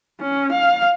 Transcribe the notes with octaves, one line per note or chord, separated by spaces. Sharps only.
C#4
F5